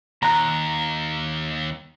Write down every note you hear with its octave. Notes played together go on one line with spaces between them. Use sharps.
D#2 A#5 F#6